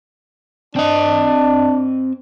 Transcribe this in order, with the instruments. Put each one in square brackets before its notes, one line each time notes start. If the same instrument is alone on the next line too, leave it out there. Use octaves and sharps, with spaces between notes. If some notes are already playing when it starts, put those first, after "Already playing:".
[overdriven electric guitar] C4 D#5 [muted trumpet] D4